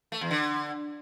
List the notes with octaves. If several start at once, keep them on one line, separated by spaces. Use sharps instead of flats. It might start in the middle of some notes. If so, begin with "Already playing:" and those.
A3
E2
D3